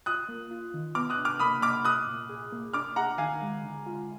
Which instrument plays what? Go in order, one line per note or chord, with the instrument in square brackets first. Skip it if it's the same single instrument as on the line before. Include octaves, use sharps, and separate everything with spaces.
[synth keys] F4 [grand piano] D#6 F#6
[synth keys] A#3
F4
D#3
[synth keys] B3 [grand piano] D6 F6
[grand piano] D#6 F#6
[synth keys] D4
[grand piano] D6 F6
[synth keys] A#3 [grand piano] B5 D#6
[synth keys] A#3 [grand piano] D6 F6
[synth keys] A#3 [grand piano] D#6 F#6
[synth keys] A#2
G#4
A#3
[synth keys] D4 [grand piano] D6 F6
[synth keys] G#4 [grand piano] F#5 A#5
[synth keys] D#3 [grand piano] F5 G#5
[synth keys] G#3
D3
F4